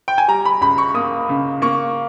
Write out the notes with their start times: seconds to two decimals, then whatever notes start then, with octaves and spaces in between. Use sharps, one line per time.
0.08 G5
0.18 G#5
0.28 G3 A#5
0.45 B5
0.61 C#2 B5
0.78 C#6
0.94 A#3 D#6
1.29 C#3
1.62 A#3 C#6